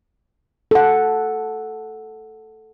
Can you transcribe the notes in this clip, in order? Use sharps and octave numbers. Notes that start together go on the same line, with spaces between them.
A4 F#5